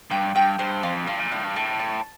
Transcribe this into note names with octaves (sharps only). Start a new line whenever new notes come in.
G2 G5
G2 G5
G2 C5
F2 F4
G2 F4
A#2
A2 D4
G2
A2 A5
A5